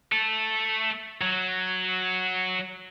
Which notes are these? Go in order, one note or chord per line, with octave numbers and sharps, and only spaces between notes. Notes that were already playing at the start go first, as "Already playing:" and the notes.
A3
F#3